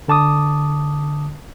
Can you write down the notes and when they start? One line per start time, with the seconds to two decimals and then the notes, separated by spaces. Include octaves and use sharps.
0.08 D3 A5 D6 D#6